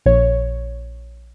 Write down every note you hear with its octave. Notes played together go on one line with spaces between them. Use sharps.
A#1 C#5